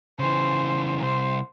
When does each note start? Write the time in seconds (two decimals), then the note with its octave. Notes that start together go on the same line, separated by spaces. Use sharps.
0.19 C#3 E3 C5
1.00 C2 C5